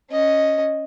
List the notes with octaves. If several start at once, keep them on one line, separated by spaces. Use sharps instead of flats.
C#4 D#5